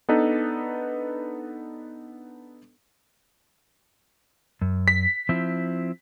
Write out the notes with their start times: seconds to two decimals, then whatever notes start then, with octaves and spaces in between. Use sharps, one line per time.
0.09 B3 D4 D#4 A4 B4
4.62 F#2
4.88 B6
5.29 F3 C4 E4